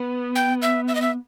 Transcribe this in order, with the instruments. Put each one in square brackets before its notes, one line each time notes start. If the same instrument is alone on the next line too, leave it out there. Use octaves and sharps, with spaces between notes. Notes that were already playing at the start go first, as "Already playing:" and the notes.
Already playing: [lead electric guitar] B3
[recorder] G5
E5
E5
D#5
E5